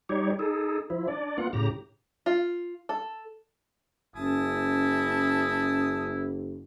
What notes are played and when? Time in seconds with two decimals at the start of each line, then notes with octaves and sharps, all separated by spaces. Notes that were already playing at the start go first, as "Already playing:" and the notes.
0.09 G3 D#4 G4 C#5
0.39 D#4 G#4 A4
0.90 F3 E4
1.08 D4 D5
1.38 A#3 B3 F4 F#5
1.53 A2 C#3 G4 A#5
2.26 F4
2.89 A4
4.16 F#1 C#4 E4 A5 D#6